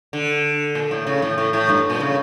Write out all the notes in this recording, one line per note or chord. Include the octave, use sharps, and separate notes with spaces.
D3
A#2
A2
C#3
A2
A2
A2
G2
A#2
C#3